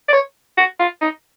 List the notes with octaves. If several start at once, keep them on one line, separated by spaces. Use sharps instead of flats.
D5
C#5
F#4
F4
D#4